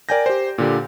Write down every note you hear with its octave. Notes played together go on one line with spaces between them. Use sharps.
A#4 D5 G5 G#5 G6 A#6
G4 C5
A#2 D3 G4